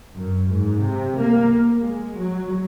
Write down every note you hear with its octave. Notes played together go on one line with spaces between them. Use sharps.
F#2
G#2
C3
A#3
G#3
F#3